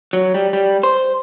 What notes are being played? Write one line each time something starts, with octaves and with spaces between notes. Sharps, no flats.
F#3
G3
G3
C5